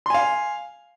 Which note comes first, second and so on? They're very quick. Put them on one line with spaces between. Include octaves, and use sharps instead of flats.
C6 G#5 F5